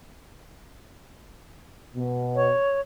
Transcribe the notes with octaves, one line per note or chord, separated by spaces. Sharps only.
B2
C#5